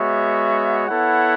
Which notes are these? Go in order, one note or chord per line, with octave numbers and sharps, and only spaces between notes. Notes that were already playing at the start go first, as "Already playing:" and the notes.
Already playing: G#3 B3 F#4 C#5 E5
B3 E4 A4 C#5 F#5